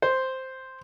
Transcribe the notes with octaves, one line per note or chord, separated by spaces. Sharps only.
C5